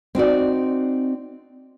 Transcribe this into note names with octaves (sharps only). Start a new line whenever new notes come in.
C4 D#4 F#4 D5